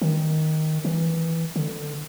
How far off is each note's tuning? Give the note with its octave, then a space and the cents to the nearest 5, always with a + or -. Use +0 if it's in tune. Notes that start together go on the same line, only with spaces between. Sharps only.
D#3 +5
E3 -5
D3 +15